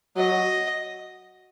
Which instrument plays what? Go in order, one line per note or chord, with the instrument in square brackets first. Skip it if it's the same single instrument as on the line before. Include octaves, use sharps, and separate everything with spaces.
[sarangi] F#3 [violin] D#5